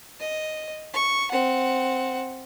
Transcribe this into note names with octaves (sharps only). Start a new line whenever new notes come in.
D#5
C#6
C4 F#5